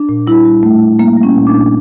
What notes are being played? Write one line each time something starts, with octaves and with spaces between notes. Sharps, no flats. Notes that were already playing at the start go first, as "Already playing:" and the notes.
Already playing: D4
A#2
G3 E4
G3
A#2 A3
A#2
G3 A#3
G3
C#4
A#2
D4
A#2